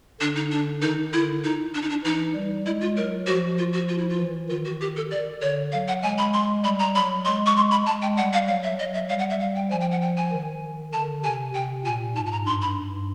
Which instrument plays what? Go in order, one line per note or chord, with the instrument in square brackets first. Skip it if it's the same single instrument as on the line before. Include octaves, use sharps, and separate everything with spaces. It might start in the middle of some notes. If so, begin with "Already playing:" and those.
[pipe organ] D3 [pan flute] D4
[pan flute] D#4
D4
[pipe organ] D#3 [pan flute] D#4
[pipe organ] D3 [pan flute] E4
[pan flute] D#4
D4
D#4
D4
[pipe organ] E3 [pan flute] D#4
[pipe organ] G3
[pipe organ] G#3 [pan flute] E4
[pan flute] F4
[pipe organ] F#3 [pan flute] A#4
[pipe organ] F3 [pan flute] F#4
[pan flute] F4
F#4
F4
E4
F4
[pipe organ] E3
[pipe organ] D#3 [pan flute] F4
[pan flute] F#4
G4
A4
D5
[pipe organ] D3 [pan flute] C#5
[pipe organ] F#3 [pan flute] F5
[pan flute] F#5
[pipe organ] G#3 [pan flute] G#5
[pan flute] B5
C6
[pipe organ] G3 [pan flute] B5
[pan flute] A#5
[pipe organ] F#3 [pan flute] B5
[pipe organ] G#3 [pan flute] C6
[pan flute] C#6
C6
B5
[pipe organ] G#3 [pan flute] A5
[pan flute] G5
[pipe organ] G3 [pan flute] F#5
[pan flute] F5
[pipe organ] F#3 [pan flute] F5
[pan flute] E5
[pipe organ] F#3 [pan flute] D#5
[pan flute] E5
[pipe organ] G3 [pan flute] F5
[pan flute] F#5
E5
F5
G5
[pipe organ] F3 [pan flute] G#5
[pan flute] G5
F#5
G5
G#5
[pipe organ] D#3
[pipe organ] D3 [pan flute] A5
[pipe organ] C3 [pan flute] G#5
[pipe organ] C3 [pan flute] G5
[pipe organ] A#2 [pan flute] G#5
[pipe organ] G#2 [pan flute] A5
[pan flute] A5
A#5
[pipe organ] G2 [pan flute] C6
[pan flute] B5
[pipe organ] G2